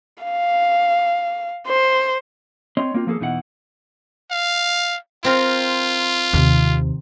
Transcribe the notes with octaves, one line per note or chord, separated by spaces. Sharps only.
F5
C5
C4 C#5 D#5 C6
A#3 C4 F4
F3 A#3 G#4 A4
E2 B2 D#4 E4 F#4 F#5
F5
C4 F4 A#4
D#2 C3